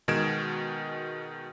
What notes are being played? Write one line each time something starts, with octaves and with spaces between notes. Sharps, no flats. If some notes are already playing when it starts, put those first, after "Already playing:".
B2 D#3 G#3 G#6 D7 E7